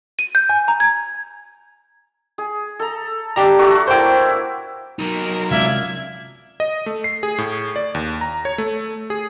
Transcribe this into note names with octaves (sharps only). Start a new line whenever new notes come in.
D#7
G6
G#5
A#5
G#6
G#4
A4 A#5
G3 D4 G4 A#5
A3 D4 F#4
A#3 E4 C5 G5
F#3 D#4 A#4
C3 G#3 C#4 F4 D5 E5 G#6
D#5
A3
C7
G#4
A2
D5
D#2
A#5
C#5
A3
G#4